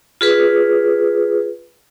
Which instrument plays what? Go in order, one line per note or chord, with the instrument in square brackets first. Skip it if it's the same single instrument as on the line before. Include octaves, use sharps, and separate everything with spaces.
[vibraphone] F4 G#4 B4